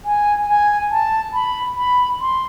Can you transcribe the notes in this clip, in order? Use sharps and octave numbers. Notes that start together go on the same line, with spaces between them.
G#5
G#5
A5
B5
B5
C6